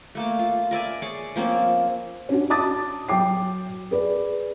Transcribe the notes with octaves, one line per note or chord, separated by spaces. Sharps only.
A3 A#3 A5
F4
A#4 D5 E5 G#5
G#4 C#5 D5
F3 A#3 C4 C#4
C#4 D4 F#4
A5 D6 D#6 A6
F#3 G5 D6 C7
G#4 B4 D5